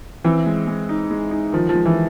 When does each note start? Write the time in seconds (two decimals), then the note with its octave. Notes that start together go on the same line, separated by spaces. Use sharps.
0.25 E3 C4
0.46 G#3
0.67 G#3
0.89 D#4
1.11 G#3
1.31 D#4
1.53 D#3 F3
1.69 F3
1.75 G#3
1.85 E3